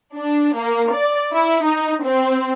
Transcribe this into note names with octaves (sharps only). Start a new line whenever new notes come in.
D4
A#3
D5
E4
D#4
C4